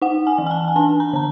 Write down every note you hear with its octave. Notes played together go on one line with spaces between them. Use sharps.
D#4 F#5
G#5
E3
G#5
A5
G#5
D4 A5
A#5
D3 A#5